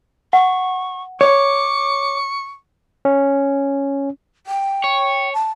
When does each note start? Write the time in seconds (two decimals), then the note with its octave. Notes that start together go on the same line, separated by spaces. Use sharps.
0.33 F#5 C#6
1.21 C#5 C#6 D6
3.05 C#4
4.47 G5
4.84 C#5
5.34 A5